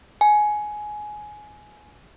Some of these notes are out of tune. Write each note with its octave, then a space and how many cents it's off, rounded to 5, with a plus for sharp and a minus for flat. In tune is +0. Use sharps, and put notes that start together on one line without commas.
G#5 +15